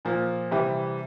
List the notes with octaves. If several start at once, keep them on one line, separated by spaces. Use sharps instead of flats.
A#2 F3 A#3
C3 E3 G3